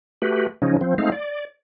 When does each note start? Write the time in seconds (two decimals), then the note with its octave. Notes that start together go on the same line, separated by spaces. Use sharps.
0.22 A3 F#4 G4 B4
0.62 C#3 F3 C#4 D#4
0.81 F3 C4
0.98 G#3 A3 C4 D#4 F5
1.12 D5